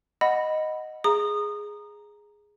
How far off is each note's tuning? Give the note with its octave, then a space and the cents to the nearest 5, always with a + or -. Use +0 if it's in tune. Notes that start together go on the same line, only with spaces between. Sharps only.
D#5 +0 F#5 +0 B5 +0
G#4 +0 A#5 +0 D#6 -20